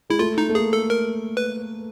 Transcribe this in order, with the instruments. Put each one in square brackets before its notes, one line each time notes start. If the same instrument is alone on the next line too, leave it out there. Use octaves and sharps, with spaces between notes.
[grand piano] G#3 [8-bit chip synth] E4
[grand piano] A3 [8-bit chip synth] F4
[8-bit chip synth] D#4
[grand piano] A3
[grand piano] A#3 [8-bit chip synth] G#4
[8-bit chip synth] A4
A#4
B4